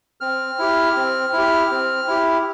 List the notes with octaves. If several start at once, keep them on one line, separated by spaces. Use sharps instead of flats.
C4 F6
E4 G4
C4
E4 G4
C4
E4 G4